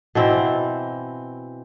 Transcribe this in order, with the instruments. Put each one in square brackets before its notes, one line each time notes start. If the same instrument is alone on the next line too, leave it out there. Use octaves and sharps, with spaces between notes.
[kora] B2 E3 C4